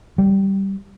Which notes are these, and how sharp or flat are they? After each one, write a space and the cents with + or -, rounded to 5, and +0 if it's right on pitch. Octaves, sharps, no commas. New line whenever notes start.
G3 -10